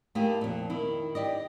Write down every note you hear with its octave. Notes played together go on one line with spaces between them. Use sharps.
A3 A#3 D#4 E4 G4 G#4
F2 A#2
D#3 E4
G4 D5 D#5